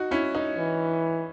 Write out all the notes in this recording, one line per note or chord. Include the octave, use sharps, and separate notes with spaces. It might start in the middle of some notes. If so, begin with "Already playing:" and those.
Already playing: D#4 F#4
C#4 E4
D#4
E3